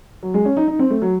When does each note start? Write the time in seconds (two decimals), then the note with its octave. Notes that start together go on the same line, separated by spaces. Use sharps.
0.23 F#3
0.34 G#3
0.45 C#4
0.57 D#4
0.68 D#4
0.79 C4
0.90 A3
1.02 F#3